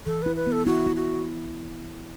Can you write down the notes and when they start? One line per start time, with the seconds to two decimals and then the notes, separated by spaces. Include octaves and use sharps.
0.06 E3 A4
0.22 E4 B4
0.36 B4
0.47 B3
0.52 A4
0.66 E4 F#4
0.86 E4
0.96 F#4